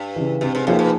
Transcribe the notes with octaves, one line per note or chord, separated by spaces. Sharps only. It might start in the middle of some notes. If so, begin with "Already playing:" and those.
Already playing: G2
C#3 E3
G2 C3
G#2
A2 F3 A#3 D#4 G#4
B2